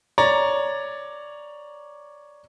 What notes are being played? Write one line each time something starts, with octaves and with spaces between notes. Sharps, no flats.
C#5 D5 A#5